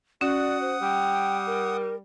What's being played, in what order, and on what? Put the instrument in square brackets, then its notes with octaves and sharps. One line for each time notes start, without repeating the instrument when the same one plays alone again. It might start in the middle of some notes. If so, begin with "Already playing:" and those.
[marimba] C#4 [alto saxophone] F#4 [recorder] D5 [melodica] F#5 D#6
[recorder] C5
[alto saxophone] G3 [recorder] G5
[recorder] A#4